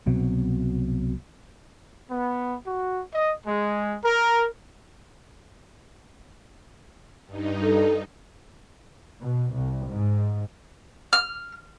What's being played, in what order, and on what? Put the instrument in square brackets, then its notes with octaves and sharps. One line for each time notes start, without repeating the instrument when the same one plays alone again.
[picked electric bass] C2 B2 F#3 C4
[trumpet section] B3
F#4
D#5
G#3
A#4
[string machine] G2 D#4
[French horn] A4
[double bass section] B2
C2
G#2
[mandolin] F6